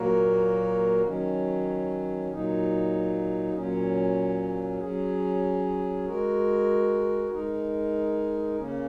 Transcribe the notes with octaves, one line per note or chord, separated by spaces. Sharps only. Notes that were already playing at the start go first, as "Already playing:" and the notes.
Already playing: A#2 F#3 A#3 F#4 A#4
D#3 F#3 C#4
A#2 F#3 D#4
A#2 F#3 C#4
F#3 C#4 G#4
G#3 F#4 A#4
G#3 D#4 A#4
C#3 A#3 C#4